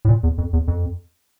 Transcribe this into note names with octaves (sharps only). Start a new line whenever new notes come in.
A2
A#2
E2
F2
E2
F2